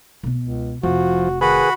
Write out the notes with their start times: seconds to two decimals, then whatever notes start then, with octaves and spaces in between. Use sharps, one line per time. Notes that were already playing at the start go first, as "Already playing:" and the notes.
0.23 B2 B3
0.41 C#2
0.83 F1 F3 F#4
1.41 D#3 F#4 G#4 B4 B5